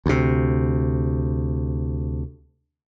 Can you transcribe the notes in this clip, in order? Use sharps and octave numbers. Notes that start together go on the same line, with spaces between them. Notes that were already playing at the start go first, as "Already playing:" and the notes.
D2 C3